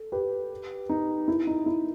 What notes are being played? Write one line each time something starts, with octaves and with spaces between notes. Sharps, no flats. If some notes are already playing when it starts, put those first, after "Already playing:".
Already playing: A4
G4 B4
D#4
E4
D#4
E4